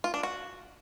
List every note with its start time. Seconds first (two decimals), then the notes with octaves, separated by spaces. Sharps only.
0.04 F4
0.14 D4
0.23 F#4